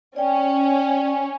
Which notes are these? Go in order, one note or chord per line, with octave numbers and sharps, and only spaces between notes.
C#4 D5 G5